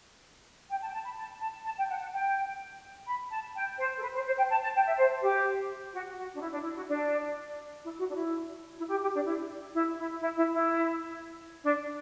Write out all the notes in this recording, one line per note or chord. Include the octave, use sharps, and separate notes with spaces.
G5
A5
G5
A5
B5
A5
A5
A5
G5
F#5
F#5
G5
B5
A5
G5
C5
A4
B4
C5
C5
G5
A5
A5
G5
E5
C5
G4
F#4
F#4
D4
E4
D4
E4
F#4
D4
E4
F#4
D4
E4
E4
G4
G4
D4
E4
E4
E4
E4
E4
E4
D4